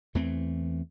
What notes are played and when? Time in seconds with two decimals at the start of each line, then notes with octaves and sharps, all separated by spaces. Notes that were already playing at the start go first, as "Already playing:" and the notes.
0.15 E2 E3 A3 C4